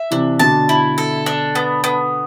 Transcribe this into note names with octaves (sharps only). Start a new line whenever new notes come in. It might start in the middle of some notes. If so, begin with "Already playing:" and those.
Already playing: E5
C3 E3 D4
B2 D3 A5
E4
A4
D4
B3
B3